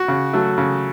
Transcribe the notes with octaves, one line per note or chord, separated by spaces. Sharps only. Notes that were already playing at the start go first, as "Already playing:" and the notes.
Already playing: F#4
C#3
F#3 A3
C#3